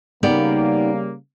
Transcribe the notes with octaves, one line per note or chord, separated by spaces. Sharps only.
C#3 G3 A#3 B3 D#4 G4 D5